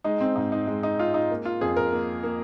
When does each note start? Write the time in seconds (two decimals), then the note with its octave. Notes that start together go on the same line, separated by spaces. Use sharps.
0.04 G#3 D#4
0.21 C4
0.36 G#2 D#4
0.52 D#4
0.67 G#3
0.83 D#4
0.99 G#3 F4
1.14 D#4
1.31 A#3
1.45 F4
1.61 F2 G#4
1.77 A#4
1.92 A#3
2.23 A#3